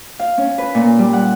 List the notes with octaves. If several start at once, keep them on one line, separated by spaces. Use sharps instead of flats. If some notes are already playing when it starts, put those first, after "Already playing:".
F5
C#4
B4
A#2
G3
F#5